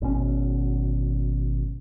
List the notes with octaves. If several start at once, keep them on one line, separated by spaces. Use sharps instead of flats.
G#1 B2 D#3 C#4